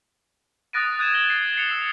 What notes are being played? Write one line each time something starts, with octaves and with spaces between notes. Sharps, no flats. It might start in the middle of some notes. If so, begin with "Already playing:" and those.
D#6 F#6 A6 A#6 D7 D#7
D#6 F#6 G#6 D#7 E7
G#6 A#6 E7 F#7 G7
C7
C7 C#7 F7 F#7
E6